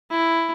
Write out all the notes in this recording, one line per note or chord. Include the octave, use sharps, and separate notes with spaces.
E4